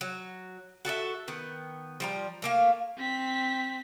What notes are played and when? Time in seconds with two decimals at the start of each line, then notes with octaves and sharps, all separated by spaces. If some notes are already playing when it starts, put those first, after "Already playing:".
0.01 F#3
0.85 F#4 A4 D#5 E5
1.28 D#3 B3
2.00 F3 G3 A#5
2.42 A3 A#3 F5
2.97 C4 B6